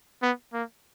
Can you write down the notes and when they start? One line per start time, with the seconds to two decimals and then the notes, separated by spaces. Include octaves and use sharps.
0.22 B3
0.53 A#3